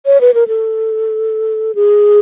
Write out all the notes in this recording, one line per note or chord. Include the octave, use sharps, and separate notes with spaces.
C#5
B4
A#4
A4
G#4